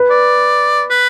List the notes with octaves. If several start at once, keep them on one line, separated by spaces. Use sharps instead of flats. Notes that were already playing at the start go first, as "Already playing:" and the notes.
Already playing: B4
D5
B4